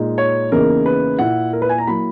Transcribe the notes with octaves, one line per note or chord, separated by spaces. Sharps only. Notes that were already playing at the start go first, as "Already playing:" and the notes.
Already playing: A#2 G#3 D#4
C#5
E2 C#3 E3 A#3 D#4 A#4
B4
A#2 A#3 E4 F#5
A#4
B4
G#5
A#5
F#3 A#3 E4 B5